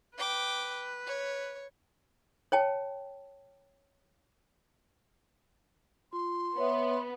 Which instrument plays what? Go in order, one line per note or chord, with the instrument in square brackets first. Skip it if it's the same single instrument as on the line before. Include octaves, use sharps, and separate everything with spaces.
[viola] B4 [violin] G5 D6
[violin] C#5
[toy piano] C#5 G5 A5
[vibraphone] F4 [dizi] C6
[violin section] B3 [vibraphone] C#5 E5